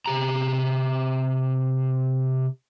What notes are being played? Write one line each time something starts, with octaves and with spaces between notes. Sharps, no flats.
C3 G4 A#5